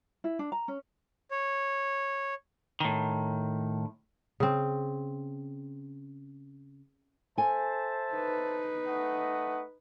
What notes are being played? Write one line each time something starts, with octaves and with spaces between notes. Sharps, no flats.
E4
D4
A#5
C#4
C#5
A2 D#3
C#3 C4
A4 C5 E5 G#5 A5
D#4 B4
A3 D#5 F#5